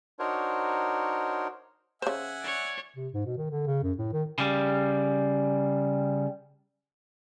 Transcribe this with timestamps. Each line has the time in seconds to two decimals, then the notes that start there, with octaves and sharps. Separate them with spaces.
0.19 D4 D#4 F#4 A#4 C5 C#5
2.02 C#3 C5 E5 F#5 G#5
2.42 C#5 D5
2.96 C3
3.14 G#2
3.26 B2
3.37 D#3
3.51 D3
3.67 C#3
3.83 F#2
3.97 A2
4.13 D#3
4.38 C#3 G3